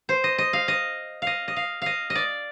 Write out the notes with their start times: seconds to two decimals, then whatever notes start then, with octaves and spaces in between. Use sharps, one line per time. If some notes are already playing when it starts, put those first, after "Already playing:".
0.09 C5
0.24 D#5
0.38 D#5
0.53 F5
0.68 D#5
1.22 D#5 F5
1.48 D#5
1.56 F5
1.82 D#5 F5
2.10 D#5
2.15 D5